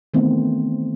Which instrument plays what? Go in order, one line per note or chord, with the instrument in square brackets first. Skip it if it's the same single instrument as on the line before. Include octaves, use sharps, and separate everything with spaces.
[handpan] D#3 E3 A3 B3 C4